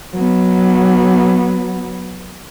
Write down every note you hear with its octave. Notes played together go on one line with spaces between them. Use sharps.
F#3 B3